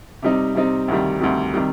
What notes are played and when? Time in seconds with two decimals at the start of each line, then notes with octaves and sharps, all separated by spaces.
0.22 C3 G3 C4 D#4
0.55 C3 G3 C4 D#4
0.88 D2 C3 D#3 G3
1.20 D2 C3 D#3 G3
1.54 C3 D#3 G3